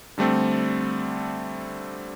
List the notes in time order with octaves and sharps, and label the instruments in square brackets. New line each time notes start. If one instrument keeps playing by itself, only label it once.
[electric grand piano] D3 G3 A3 C4